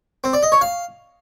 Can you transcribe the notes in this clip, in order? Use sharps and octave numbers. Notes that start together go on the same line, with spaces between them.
C4
D5
D#5
C#5
F5